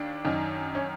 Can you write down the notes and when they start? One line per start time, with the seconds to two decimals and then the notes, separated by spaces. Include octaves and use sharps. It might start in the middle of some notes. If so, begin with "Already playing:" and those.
Already playing: D#2 D4
0.24 F#2 D#3
0.75 C#4